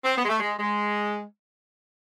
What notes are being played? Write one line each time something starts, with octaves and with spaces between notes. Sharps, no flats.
C4
B3
G#3
A3
G#3
G#3